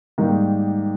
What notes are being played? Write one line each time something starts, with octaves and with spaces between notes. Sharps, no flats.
G#2 D#3 G3 A#3 D#4